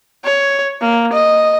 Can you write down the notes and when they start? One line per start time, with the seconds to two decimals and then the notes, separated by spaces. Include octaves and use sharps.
0.24 C#5
0.81 A#3
1.13 D#5